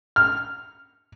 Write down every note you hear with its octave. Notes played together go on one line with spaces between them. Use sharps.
F6